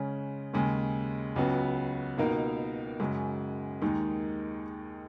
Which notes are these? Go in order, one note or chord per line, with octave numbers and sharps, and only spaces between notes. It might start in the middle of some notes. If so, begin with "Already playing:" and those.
Already playing: C#3 G#3 C#4
D#2 C#3 G#3
C#2 C#3 F#3 B3 F#4
C#2 B2 A#3 D#4 A#4
F#2 C#3 G#3
D#2 D#3 G#3 D#4